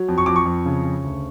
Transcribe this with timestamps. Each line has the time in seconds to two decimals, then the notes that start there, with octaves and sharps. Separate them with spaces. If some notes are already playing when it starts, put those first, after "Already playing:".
Already playing: F#3
0.08 F2
0.18 C#6
0.26 F2 D6
0.36 C#6
0.45 F2
0.66 C#3
0.84 C#3
1.04 D2